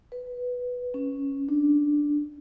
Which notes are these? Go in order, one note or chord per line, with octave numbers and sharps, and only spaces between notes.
B4
C#4
D4